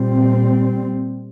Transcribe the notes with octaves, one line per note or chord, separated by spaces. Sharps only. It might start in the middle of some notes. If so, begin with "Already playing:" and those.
Already playing: A#2 G3 C4